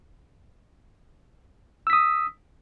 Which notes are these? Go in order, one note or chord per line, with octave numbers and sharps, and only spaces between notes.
D#6 E6 B6